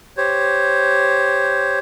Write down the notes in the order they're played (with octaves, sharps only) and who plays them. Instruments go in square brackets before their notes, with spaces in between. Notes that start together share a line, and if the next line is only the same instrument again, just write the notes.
[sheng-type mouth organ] G4 C5 C#5